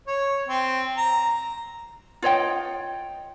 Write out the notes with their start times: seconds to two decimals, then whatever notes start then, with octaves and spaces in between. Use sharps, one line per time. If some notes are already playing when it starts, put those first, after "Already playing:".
0.07 C#5
0.47 C4
0.97 A#5
2.22 F4 C#5 D#5 G5